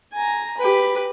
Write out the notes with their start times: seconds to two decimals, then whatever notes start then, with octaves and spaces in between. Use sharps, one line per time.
0.13 G#5 A#5
0.57 G4 B4